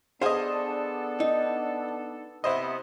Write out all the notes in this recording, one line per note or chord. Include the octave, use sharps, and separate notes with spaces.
B3 D4 G#4 A4 C5 D#5 F5
D#4
C3 B3 E4 C5 D#5